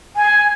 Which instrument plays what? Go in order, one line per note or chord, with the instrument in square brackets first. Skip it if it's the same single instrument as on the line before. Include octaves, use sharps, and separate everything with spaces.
[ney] G#5